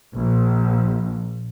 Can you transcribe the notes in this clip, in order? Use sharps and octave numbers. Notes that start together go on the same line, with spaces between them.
A#1